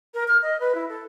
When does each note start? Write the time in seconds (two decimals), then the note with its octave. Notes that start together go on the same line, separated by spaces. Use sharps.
0.14 A#4
0.28 F6
0.43 D#5
0.60 B4
0.75 E4
0.89 A4